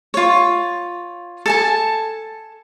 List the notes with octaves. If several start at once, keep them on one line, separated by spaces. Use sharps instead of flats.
F4 C#5
A4 G#5 A5